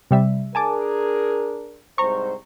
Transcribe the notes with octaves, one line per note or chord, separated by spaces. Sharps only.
C3 G3 E5
D4 G#4 A#4 G#5 A5 D6
C2 G#2 C5 A#5 C#6